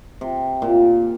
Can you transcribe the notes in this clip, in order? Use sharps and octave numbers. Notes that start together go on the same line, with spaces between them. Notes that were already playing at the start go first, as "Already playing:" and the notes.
C3
A#2